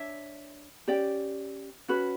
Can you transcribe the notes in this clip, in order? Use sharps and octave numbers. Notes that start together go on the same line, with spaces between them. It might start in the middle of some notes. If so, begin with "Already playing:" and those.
Already playing: D4 C#5 E5
C#4 G4 D5 G5
C#4 F#4 B4